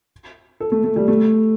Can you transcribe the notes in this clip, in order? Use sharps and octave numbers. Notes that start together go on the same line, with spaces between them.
A4
A3
A3
G3
A3